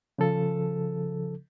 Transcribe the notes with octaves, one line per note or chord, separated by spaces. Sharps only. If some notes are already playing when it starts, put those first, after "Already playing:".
C#3 F3 A4